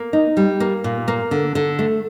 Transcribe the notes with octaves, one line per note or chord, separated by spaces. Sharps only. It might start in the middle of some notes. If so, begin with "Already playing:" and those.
Already playing: A#3
D#4
G3
A#3
A#2
A#3
D3
D3
A3